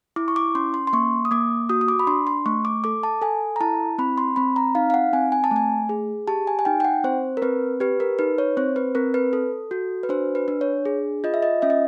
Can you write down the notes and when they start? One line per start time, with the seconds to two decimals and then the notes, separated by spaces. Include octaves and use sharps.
0.16 E4 D6
0.28 C#6
0.36 D6
0.55 C#4 C6
0.74 C6
0.87 C6
0.93 A#3 C#6
1.25 D#6
1.31 A#3 D6
1.69 F#4 D#6
1.81 D#6
1.88 D6
1.99 B5
2.07 D4 C6
2.27 C6
2.46 A3 C#6
2.65 D6
2.84 A4 D6
3.03 A5
3.22 A4 G#5
3.56 A#5
3.60 E4 A5
3.98 C4 B5
4.18 C6
4.36 C4 B5
4.56 A#5
4.75 D#4 F5
4.90 F5
4.94 F#5
5.13 C4 G#5
5.32 G#5
5.44 A5
5.51 A3
5.56 G#5
5.89 G#4
6.27 G4 A5
6.47 G#5
6.59 G#5
6.65 D#4 G5
6.80 G5
6.85 F#5
7.04 C4 C5
7.37 A#4
7.42 C4 B4
7.80 G4 B4
8.00 A#4
8.19 D#4 B4
8.38 C#5
8.57 C4 C5
8.76 B4
8.95 C4 A#4
9.14 B4
9.33 A4
9.71 F#4
10.03 B4
10.09 D4 C5
10.35 B4
10.48 D4
10.61 C#5
10.85 G#4
11.24 F4 D#5
11.34 E5
11.43 D#5
11.62 C#4 E5
11.70 D#5